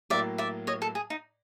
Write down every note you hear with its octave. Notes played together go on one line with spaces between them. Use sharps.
A2 F#3 A#3 D5 E5
D5 E5
C#5 D#5
A4
G#4
D#4